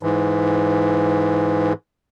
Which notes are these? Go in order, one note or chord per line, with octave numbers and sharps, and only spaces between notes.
G#2 E3